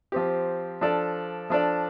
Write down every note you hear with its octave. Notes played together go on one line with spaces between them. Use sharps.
F3 C4 G4
F3 D4 A4 D5
F3 D4 A4 D5